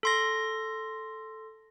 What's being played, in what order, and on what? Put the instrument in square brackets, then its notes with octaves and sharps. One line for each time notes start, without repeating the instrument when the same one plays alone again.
[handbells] A4 C6 A#6